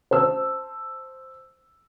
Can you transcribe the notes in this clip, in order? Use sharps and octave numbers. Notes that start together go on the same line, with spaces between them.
C5 A5 E6